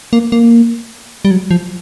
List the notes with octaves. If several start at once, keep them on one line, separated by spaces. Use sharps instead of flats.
A#3
A#3
G3
F#3
F3